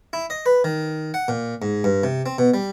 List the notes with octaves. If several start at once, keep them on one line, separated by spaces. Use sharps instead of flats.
E4
D#5
B4
D#3
F#5
A#2
G#2
G2
C3
C4
B2
G3